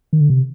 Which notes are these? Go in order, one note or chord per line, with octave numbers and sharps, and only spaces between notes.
D#3
D3
C3